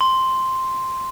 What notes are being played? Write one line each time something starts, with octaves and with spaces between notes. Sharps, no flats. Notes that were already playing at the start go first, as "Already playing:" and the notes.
C6